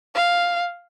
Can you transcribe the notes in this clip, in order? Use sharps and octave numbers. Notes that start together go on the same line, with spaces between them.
F5